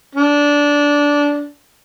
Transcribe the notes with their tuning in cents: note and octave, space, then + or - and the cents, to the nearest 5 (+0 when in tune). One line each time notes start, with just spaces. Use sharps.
D4 -15